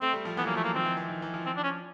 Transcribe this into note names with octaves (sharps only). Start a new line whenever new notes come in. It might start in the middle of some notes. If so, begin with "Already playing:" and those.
A3 C4
G3
F3
E3 B3
F#3 A#3
F3 A3
A#3
D#3 C4
F3
E3
E3
D#3
E3
F3
C4
D4
C#4